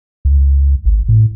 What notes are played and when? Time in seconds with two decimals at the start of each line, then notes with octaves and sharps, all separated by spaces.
0.25 C#2
0.85 G#1
1.09 A2